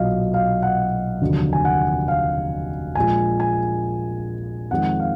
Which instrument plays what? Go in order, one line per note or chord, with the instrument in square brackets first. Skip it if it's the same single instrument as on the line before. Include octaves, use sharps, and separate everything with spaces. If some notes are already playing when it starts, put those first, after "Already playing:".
Already playing: [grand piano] B1 A#2 F#3 D#5 F5
F5
F#5
F1 D#2 D3 F#3
G#5
F#5
F5
A#1 A#2 G#3 G#5
G#5
F2 D#3 G#3 F#5
F5